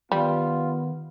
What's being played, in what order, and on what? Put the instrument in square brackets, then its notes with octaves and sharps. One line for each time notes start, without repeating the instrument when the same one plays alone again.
[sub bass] D#3 [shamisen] G3 [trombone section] B3 [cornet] F4